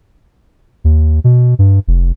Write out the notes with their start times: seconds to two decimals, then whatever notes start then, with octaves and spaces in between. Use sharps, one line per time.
0.84 D#2
1.24 B2
1.59 G2
1.88 F1